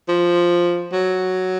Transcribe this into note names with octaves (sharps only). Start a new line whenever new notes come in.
F3
F#3